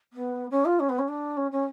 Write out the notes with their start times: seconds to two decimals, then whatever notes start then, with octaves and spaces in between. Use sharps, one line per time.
0.13 B3
0.50 C#4
0.65 F4
0.79 C#4
0.89 B3
0.98 C#4
1.08 D4
1.37 C#4
1.51 C#4